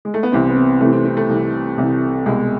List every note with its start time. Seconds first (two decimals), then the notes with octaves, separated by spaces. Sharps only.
0.05 G#3
0.14 A3
0.23 B3
0.32 C2 C3 E3 C4
0.49 B3
0.56 C4
0.81 C2 C3 E3 A3
0.93 C4
1.05 C4
1.17 A3
1.29 C2 C3 E3
1.78 C2 C3 E3
2.26 C2 B2 G#3